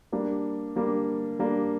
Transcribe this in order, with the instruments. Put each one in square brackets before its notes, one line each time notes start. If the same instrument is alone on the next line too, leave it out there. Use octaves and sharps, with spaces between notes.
[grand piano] G3 A#3 D4
G3 A#3 D4
G3 A#3 D4